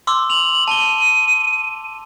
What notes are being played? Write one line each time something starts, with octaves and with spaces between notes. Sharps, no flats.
C6 D6 E6
F7 F#7
A5 D#7 G7